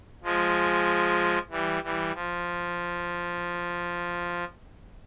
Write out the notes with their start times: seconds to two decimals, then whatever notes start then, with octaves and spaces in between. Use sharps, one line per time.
0.23 F3 G#3
1.50 E3 G3
1.83 E3 G3
2.14 F3